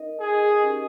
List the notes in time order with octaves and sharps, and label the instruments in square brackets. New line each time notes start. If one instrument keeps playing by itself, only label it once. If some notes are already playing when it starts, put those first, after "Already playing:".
Already playing: [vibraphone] D#4 A#4 D#5
[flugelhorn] G#4
[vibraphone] C#4 G4 A#4